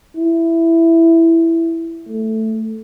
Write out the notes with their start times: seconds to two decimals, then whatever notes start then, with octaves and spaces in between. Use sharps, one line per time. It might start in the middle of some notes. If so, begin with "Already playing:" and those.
0.17 E4
2.09 A3